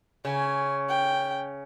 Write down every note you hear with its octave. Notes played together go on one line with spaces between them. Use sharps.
C#3 G#5
G5